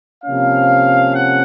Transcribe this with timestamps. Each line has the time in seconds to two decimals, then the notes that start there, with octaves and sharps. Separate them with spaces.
0.24 C3 F3 A#3 C#4 F5
1.14 F#5